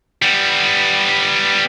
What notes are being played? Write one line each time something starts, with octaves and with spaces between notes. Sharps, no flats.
G3 B3